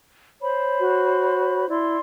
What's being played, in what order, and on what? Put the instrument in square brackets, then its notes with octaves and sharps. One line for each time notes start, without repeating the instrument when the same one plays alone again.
[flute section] C5 C#5 B5
[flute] F#4
[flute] E4 [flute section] D5 C6